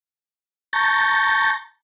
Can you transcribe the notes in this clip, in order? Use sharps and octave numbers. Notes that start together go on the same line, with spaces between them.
A5 A#5 C#6 G6 A6 A#6